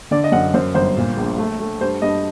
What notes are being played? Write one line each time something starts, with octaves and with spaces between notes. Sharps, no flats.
D3 D5
D#5
F#2 F#5
F#2 C5
G1 C5
A#2
A#1
A3
A3
G2 C5
G2 D#5